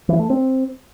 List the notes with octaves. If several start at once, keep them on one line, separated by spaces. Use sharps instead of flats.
E3
A3
C4